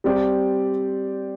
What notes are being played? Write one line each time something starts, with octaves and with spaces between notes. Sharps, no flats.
G3 C4 G4 D5